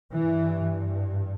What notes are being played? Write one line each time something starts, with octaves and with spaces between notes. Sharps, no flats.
G2 E3